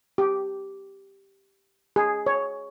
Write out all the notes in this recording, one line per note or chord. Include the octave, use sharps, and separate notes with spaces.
G4
G#4
C#5